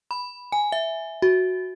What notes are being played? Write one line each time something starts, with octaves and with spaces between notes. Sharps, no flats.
B5
G#5
E5
F#4